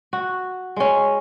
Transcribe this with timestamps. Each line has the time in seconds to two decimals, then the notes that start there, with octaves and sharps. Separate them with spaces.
0.13 F#4
0.76 G#3 C#4